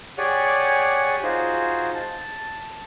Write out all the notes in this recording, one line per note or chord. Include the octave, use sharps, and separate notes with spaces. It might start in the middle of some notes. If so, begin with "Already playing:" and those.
G4 G#4 C#5 D5 F#5 G#5
D#4 F4 F#4 G#4 C5
A5